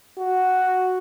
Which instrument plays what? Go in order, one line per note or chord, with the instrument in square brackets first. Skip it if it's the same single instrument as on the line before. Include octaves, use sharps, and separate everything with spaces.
[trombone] F#4